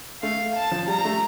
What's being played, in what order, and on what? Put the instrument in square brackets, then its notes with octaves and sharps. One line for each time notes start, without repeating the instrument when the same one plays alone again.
[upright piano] A3 [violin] F5
[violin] A5
[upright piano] F3
[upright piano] G3 [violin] A#5
[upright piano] A3